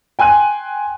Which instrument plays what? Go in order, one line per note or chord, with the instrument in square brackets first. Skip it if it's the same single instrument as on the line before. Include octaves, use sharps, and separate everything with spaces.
[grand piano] G5 G#5 C6 F#6 D#7